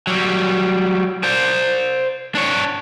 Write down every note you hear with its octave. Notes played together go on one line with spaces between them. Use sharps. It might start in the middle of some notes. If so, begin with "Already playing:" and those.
F#3 G3
C5 D5
D4 C#5